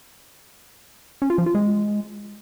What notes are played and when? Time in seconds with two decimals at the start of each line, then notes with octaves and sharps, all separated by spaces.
1.22 C#4
1.30 F4
1.38 F3
1.46 F4
1.55 G#3